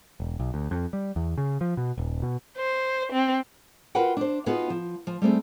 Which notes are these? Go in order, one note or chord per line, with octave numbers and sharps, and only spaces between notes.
E1
B1
D2
F2
G3
E2
C#3
F3
B2
D#1
B2
C5
C4
F4 F#4 A#4 B4 F#5 G5
D4 C5
B3 D#4 F4 F#4 G#4 B4
F3
F3
G3 A3 C4 G#4